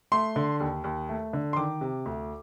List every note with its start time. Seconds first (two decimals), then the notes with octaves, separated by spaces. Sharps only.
0.12 A3 C6
0.36 D3
0.60 D#2
0.84 D#2
1.09 A3
1.33 D3
1.53 C6
1.56 D#3 D6
1.81 C3
2.05 D2